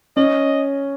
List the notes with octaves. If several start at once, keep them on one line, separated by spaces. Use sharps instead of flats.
C#4 D#5